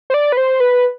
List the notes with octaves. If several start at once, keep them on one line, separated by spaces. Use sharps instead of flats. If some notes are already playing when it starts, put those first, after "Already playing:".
C5
D5
B4
C5
B4